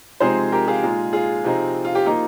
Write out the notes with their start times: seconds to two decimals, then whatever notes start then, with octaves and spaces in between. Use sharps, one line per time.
0.20 C3 F3 G#3 C4 D#4 G#4 C5
0.52 G4 A#4
0.68 F4 G#4
0.83 A#2 G#3 D#4
1.13 F4 G#4
1.44 C3 F3 C4 D#4
1.85 F4
1.95 G4
2.06 F3 A#3 D#4 F4